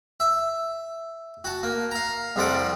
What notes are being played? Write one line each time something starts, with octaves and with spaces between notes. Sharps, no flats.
E5
F#4 A5
A#3
F5 A#5
C2 F2 F3 G3 F#5 D6